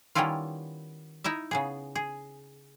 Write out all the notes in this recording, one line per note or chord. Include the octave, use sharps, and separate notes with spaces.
D#3 G3 B3 C#4 E4 F4
D#4 E4 D#5 E5
C#3 B3 G#4
G#4